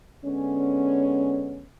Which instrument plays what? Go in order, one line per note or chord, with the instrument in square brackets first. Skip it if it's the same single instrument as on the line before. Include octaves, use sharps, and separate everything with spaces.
[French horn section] D3 G#3 B3 C#4